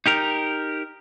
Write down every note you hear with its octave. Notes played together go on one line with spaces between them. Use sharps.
D#4 G4 A#4